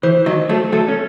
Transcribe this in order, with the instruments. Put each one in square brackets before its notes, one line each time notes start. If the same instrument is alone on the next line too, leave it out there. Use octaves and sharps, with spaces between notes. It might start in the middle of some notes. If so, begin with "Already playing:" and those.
[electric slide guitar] E3 [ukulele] C5
[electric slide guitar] D#3 F#3 [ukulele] D#5
[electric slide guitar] F#3 A3 [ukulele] A4
[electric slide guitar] F#3 A3 [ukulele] A4
[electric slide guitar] C#4